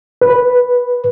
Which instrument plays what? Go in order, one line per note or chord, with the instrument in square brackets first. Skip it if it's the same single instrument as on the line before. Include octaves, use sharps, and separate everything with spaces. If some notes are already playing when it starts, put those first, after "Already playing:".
[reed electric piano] B4